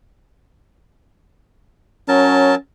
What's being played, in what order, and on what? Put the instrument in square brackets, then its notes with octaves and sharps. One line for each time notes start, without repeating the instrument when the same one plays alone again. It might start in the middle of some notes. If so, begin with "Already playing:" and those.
[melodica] F#3 A#4 A5 [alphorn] C#4